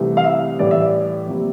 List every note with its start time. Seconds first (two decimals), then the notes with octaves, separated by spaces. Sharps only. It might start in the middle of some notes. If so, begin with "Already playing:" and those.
Already playing: C2 C3 E3 A3
0.17 F5
0.24 E5
0.59 A2 E3 G3 D5
0.71 E5
0.81 D5
1.27 F2 C3 G3 A#3